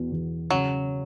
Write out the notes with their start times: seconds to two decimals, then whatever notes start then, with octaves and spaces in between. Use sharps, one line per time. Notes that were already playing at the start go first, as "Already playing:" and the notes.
Already playing: E2 B2 B3
0.12 E2
0.50 C#3 F#3